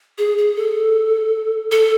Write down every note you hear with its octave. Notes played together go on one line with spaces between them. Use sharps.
G#4
G#4
A4
A4